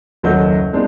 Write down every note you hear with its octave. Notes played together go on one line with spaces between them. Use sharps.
F#1 D#2 F#3 A4 D#5 G6
G3 G#3 A#3 C4 D4 D#4